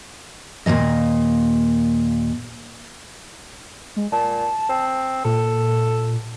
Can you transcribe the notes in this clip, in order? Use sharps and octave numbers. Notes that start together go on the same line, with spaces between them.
D#2 A#2 D#3 G#3 D#5
G#3
A#2 A5
C4
A#2 A4